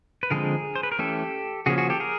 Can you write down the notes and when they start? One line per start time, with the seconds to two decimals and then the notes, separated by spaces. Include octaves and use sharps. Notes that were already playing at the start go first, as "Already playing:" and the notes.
0.23 B4
0.30 D3 F3 G#3 C4 G#4 A#4
0.76 C5
0.83 B4
0.92 A#4
0.98 E3 A3 C#4 G4 A4
1.66 C#3 F3 A#3 C#4 F#4 G#4
1.78 F#4 G#4
1.90 G4 A4
2.00 G#4 A#4